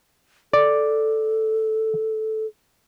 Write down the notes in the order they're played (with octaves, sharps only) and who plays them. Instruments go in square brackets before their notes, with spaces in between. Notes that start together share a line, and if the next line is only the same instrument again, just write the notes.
[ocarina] A4 [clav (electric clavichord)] D5